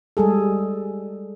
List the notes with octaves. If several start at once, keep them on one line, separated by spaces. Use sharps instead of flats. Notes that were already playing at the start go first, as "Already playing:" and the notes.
G3 G#3 G#4 A4